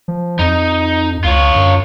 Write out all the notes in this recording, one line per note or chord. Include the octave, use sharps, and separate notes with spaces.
F3
F2 D#4
C#2 F4 C#5
F#2